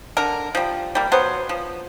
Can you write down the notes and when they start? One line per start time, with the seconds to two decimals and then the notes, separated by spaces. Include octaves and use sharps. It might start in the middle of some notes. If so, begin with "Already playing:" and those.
0.17 D3 A#4
0.55 F3 G3
0.95 G3 A#3
1.12 F#3 B3 C5
1.49 F3